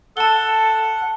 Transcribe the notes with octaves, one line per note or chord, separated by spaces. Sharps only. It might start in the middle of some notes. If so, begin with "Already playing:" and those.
A4 F#5 A5 G7